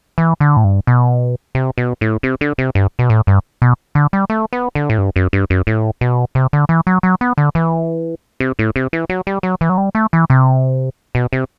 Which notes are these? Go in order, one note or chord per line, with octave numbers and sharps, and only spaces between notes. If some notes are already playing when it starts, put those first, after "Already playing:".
E3
D3
A2
G2
B2
C3
B2
A2
C3
D3
C3
G2
B2
A2
G2
B2
D3
G3
A3
B3
D3
A2
G2
F#2
G2
F#2
A2
B2
C3
D3
E3
F#3
F#3
B3
D3
E3
C3
A2
C3
E3
F#3
G3
F#3
E3
F#3
G3
A3
E3
C3
B2
C3